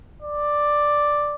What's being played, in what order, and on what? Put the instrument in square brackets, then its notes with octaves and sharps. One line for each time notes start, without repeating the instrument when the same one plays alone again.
[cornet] D5